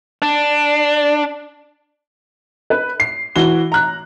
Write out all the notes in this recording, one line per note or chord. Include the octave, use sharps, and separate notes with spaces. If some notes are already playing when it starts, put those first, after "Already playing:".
D4
B4
C7
E3 F#4 G7
A#5 F#6